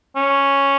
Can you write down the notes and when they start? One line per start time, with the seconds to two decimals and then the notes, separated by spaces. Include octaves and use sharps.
0.16 C#4